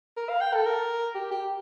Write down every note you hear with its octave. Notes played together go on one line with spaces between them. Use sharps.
A#4
F5
G5
A4
A#4
G4
G4